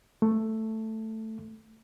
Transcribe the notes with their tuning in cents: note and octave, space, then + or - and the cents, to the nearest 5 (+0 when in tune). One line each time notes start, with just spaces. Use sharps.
A3 +5